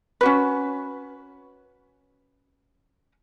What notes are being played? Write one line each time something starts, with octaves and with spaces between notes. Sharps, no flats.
C#4 F#4 B4